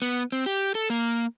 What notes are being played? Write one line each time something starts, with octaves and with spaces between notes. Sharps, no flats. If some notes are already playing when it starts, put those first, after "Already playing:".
B3
C4
G4
A4
A#3